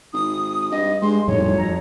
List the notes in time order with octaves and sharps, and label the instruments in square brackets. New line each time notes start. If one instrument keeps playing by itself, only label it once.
[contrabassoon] G#1 [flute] D#6
[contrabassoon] G2 [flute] D#5
[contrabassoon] G2 [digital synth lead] G#3 [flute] C6
[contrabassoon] G#1 [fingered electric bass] F2 G3 [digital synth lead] A2 [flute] C#5
[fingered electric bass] F2 [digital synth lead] A#5